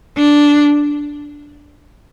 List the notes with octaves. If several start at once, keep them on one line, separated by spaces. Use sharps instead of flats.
D4